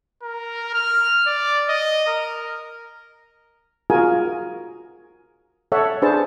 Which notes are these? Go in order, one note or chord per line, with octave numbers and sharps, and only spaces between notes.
A#4
F6
D5
D#5
A#4
F4 F#4 G#4 A#4 G#5
A4 C#5 E5 F#5
D4 G#4 B4 C5 A5